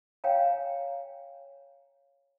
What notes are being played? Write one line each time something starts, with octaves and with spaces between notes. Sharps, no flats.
C#5 F5 G5 G#5 A#5